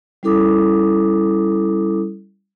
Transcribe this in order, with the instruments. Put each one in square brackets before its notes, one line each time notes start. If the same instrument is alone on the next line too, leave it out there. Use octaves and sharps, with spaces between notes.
[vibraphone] G3 C#4 E4 A4 D6 D#6